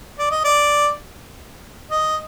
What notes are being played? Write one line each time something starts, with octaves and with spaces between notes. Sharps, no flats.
D5
D#5
D5
D#5